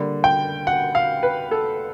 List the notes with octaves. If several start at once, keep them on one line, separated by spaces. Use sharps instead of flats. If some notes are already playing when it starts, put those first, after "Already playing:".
Already playing: D3 G3 A#3
G5
F#5
F5
B4
A4